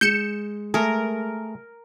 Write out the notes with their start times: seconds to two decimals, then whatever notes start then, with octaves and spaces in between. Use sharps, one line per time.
0.01 G#3 G6 C#7 E7
0.74 A3 G#4 A#4